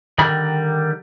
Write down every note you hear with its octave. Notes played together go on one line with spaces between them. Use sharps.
D3 D#3 G3 A#4 B5